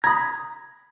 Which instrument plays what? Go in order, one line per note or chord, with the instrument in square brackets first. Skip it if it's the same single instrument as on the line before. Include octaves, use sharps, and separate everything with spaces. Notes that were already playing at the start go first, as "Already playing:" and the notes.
[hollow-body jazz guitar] A#5 B5 [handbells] D#6 G#6